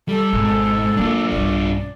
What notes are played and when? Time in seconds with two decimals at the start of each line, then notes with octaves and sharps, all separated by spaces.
0.08 G3 A4
0.33 G#1 G#2 B2
0.97 F#3 A#3 D4 F4
1.32 B1 G2 D5